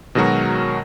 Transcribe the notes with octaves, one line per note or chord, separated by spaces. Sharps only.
B2 D#3 F#3 G#3 F#4 A#4